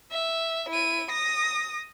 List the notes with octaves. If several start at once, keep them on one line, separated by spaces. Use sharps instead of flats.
E5
E4 D#7
D#6 A#6